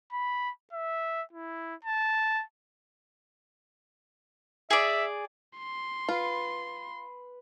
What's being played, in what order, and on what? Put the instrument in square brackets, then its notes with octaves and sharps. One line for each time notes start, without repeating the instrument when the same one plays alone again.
[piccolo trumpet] B5
E5
E4
A5
[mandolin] G#4 D5 [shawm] E5
[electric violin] C6
[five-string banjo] F4 [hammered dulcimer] B4